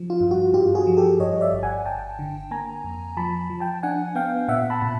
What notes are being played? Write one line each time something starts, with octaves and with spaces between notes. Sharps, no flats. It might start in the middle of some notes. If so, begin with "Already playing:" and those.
Already playing: F3
F4
G2
F#4
G2 F4 G4
F#4 G#4
F3
G4 A4
G2 C#5 D#5
D5 E5
G1
F#5 G#5
G1 G5 A5
D3
A#3 G#5 A#5
F2
F3 A5 B5
F3
G5 A5
D4 F#5 G#5
B3 F5 G5
A#2 E5 F#5
A5 B5
A#2